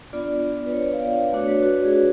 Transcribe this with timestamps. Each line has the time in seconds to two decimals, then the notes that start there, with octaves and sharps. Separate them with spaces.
0.13 B3 D4 F4 D5
0.66 B4
0.73 C#5
0.83 D5
0.94 F5
1.02 D5
1.25 D5
1.33 A3 D4 F#4 C#5
1.44 C#5
1.48 B4
1.63 F#4
1.85 G#4
1.93 F#4